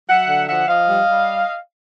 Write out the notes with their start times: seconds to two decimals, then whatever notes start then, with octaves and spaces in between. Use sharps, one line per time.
0.08 F#3 E5 F#5
0.28 D3
0.48 F3 E5 F#5
0.68 F3 D#5 F5
0.88 G3
1.07 G3